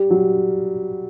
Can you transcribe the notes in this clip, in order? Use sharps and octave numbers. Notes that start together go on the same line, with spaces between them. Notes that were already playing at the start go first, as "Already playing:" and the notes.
Already playing: G3
F#3